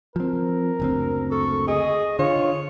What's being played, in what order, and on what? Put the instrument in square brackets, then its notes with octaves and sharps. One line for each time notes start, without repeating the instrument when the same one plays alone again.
[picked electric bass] F3 C4 [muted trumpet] A#4
[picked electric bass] F#1 D2 C4
[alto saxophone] A4 [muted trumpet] C#6
[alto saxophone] G#4 [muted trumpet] D#5
[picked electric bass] D3 [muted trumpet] F4 [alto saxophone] C#5